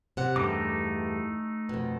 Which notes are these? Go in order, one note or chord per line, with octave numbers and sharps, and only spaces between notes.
C3 F#5
E2 G2 A3 D#4 D6
F2 B2